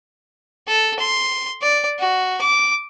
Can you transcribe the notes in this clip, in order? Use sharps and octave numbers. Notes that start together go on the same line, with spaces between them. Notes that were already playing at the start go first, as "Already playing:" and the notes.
A4
C6
D5
F#4
D6